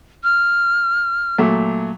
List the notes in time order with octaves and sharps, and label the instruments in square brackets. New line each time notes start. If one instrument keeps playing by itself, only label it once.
[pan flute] F6
[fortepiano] A#2 F#3 A3